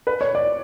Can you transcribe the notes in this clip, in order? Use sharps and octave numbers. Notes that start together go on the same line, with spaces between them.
B4
C#5
D5